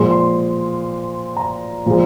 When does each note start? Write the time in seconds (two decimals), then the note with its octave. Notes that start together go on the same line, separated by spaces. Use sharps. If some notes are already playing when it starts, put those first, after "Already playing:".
Already playing: A#2 F3 G#3 C6
0.11 C6
1.37 A#5
1.86 A#2 F3 G#3